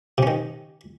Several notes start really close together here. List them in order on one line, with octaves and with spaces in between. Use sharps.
C3 C#4 D#3